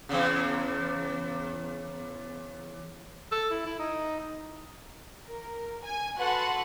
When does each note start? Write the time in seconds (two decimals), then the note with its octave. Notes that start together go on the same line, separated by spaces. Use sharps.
0.09 E2 C#3
3.32 A4
3.51 E4
3.66 E4
3.79 D#4
5.26 A#4
5.85 G#5 G#6
6.19 F#4 A4 B4 F#5 B5 C6